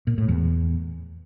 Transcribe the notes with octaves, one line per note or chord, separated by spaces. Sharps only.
A#2
A2
E2